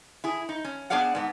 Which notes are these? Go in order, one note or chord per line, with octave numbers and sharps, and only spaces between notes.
E4 G#4
D#4
C#4
B3 D4 G#4 D5 F5 F#5
G#2 B3